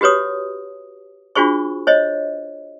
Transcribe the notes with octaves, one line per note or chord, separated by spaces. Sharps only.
F#4 G4 B4 C#5 D#6
D4 F4 F#4 G#4 C5 C#6
C5 C#5 D#5